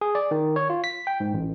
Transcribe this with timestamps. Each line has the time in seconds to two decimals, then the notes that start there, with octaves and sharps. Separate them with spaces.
0.01 G#4
0.15 D5
0.31 D#3
0.56 C#5
0.70 F4
0.84 B6
1.07 G5
1.20 G#2
1.34 A1